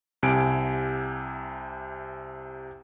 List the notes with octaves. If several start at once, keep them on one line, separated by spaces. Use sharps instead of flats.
C2 C3 G#5 D7